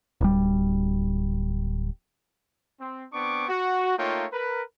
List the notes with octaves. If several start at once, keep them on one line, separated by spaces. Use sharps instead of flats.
D1 G3
C4
B3 C4 D4 C#6 D6
F#4
A3 A#3 D#4 F4 C#5 G5
A#4 B4